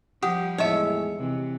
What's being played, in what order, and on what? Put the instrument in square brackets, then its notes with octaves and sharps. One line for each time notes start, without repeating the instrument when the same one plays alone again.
[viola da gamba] F3 G3 [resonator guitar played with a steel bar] G4 [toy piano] F#5 D#6
[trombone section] E2 A2 G#3 [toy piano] D#4 D#5 A5 [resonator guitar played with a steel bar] C#5 E5
[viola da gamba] C3 E3